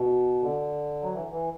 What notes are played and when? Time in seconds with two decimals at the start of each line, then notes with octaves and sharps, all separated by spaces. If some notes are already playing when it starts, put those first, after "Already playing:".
Already playing: B2
0.42 D3
1.03 F#3
1.13 E3
1.31 E3